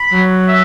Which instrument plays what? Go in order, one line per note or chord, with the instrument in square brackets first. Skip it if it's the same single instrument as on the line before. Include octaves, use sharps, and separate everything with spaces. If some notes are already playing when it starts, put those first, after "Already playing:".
Already playing: [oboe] B5
[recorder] F#3
[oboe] E5